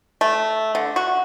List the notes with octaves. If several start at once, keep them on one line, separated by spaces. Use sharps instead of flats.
A3
D3
F#4